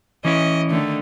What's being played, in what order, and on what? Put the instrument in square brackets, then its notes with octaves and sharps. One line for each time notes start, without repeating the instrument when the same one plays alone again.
[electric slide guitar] E3 C#4 E4 [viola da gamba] D#5
[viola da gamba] D3 D#3 A3